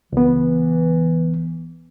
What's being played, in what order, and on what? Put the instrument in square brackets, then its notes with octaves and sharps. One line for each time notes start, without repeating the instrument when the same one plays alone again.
[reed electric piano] C#2 B3 [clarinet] E3